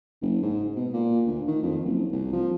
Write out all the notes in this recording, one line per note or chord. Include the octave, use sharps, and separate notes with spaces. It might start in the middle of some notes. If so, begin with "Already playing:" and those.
F#1
G#2
B2
A#2
D2
D#3
F2
F#1
C2
F3